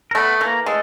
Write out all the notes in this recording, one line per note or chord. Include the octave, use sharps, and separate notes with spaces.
A#4
A3 B3 B4
E3 A#3 A#4
G#3 A3 A4